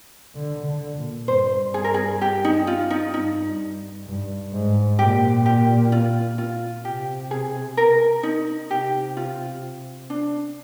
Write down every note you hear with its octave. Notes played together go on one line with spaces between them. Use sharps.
D3
D3
A#2
G2 C5
G#4
A#4
G#4
G4
D#4
F4
D#4
G2 D#4
G2
G#2
A#2 G4
G4
F4
F4
C3 G4
G#4
A#4
D#4
C3 G4
F4
D4